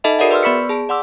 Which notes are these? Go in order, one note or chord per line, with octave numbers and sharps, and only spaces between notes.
D#4 A4 D#5 E5 A5 B5
F#4 G#4 A#4 D5 E5 F#5
B4 D5 C6 E6 F6
B3 D5 B5 C#6 B6 C#7
G#4 A5
D5 F#5 C6 D6 E6